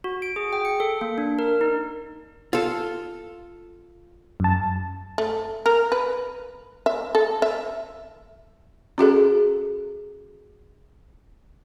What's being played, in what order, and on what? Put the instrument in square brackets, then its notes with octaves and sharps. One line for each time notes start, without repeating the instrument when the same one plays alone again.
[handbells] F#4
D7
G#4
G5
C#7
A4
A#3
D4
A#4
D#4
[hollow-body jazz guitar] F4 A4
[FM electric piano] F#2 A5
[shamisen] A3
A#4
B4
E5
A4
E5
[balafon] C#4 F#4 G#4 A4